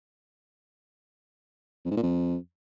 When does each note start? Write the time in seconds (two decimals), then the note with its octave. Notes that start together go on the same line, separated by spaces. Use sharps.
1.85 F2
1.91 G#2
1.97 A#2
2.03 F2